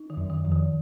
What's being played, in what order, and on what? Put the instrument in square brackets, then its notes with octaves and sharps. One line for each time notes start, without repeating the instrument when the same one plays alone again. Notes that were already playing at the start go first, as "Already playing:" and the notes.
Already playing: [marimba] D#4
D#3
[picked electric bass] F#2
[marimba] D#3
[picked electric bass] F2
[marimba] D#3